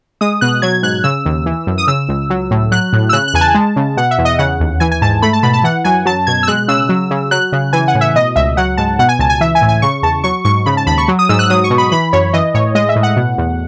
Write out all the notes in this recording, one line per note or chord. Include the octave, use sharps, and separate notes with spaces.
G#3 D#6
B2 F#6
F#3 G#6
G#2 F#6
C#3 E6
D#2
E3
F#2
D#6
C#3 E6
C#2
F#3
A2
F#3 F#6
A2
E6
C#3 F#6
F#6
E2 G#5
A5
G#3
C#3
B2 F#5
E5
E2
D#5
C#3 F#5
D#2
E3 G#5
G#5
G#2 A5
A3 B5
A5
B2 B5
A5
E3 F#5
F#2 G#5
F#3 A5
B2 G#6
E6
G#3 F#6
C#3 E6
F#3
C#3
F#3 F#6
C#3
E3 G#5
F#5
A2
E5
B2 D#5
C#2 E5
F#3 F#5
G#2 A5
B2 F#5
G#5
C#2 A5
G#5
E3 E5
G#5
A2
G#5
C#3 C#6
E2 A5
F#3 C#6
G#2 C#6
C#3 B5
A5
D#2 B5
C#6
F#3
D#6
G#2 E6
F#6
F#3 D#6
C#6
B2
B5
E3 B5
F#2 C#5
E3 D#5
A2 C#5
G#3 D#5
E5
A2
F#5
B2
E2